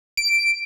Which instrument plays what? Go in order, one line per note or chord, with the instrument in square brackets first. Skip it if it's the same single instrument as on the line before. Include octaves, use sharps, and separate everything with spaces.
[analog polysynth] D7